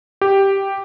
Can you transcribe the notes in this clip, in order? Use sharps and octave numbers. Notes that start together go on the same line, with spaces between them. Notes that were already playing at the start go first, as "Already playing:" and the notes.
G4